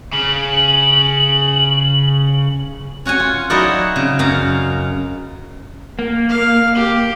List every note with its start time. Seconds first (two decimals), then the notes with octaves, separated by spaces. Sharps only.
0.13 C#3 F#7
3.05 C#4 F#4 C#5 G#5
3.20 F4
3.50 F#3 D#4 E4 F#4 D5 F#5
3.96 C#3
4.19 F#2 F5 A#5
5.99 A#3
6.29 F5
6.75 G4